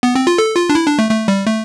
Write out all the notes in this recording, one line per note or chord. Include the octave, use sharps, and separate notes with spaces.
B3
C4
F4
A4
F4
D4
E4
D4
A3
A3
G3
A3